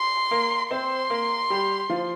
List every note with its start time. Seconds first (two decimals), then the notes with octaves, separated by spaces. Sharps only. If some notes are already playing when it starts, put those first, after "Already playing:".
Already playing: C6
0.31 A#3 A#4
0.71 C4 C5 C6
1.10 A#3 A#4
1.50 G3 G4
1.90 F3 F4